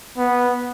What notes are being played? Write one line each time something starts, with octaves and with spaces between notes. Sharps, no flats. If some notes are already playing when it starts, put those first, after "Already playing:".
B3